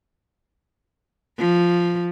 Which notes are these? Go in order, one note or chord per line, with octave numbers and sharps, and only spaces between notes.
F3